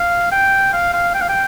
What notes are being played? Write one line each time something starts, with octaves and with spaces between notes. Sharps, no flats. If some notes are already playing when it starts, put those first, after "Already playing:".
Already playing: F5
G5
F5
F5
G5
F5
G5